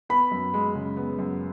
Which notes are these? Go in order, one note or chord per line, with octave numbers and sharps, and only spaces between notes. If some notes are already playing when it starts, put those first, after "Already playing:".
B3 B5
F#2
G#3
C#3
B3
F#2